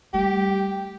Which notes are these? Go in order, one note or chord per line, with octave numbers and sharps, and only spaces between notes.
G3 A3 G4